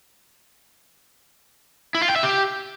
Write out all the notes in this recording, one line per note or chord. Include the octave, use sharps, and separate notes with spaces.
E4
F4
G5
E5
G4